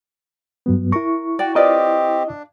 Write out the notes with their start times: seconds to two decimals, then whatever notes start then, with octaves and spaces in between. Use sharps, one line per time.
0.66 G2 F#3 B3
0.92 E4 A#4 C#6
1.39 F#4 D5 G5
1.56 C4 F4 G4 B4 D5 D#5
2.27 D4